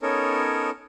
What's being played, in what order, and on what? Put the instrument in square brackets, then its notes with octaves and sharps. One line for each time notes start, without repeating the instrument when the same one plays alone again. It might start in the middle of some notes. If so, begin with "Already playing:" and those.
[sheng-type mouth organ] B3 C#4 D#4 A4 A#4 C#5